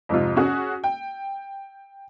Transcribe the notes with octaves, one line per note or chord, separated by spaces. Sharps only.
F2 G#2 C3 F4
C#4 F#4 G#4
G5